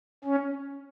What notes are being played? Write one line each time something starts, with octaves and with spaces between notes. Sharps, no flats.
C#4